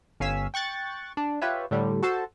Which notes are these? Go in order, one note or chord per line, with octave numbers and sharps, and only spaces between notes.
G1 C#4 F5 G#5 E6 B6
G5 C#6 F#6 A6
D4
F4 G4 B4 C#5 E5
A2 D3 G3
F#4 A4 C5 A5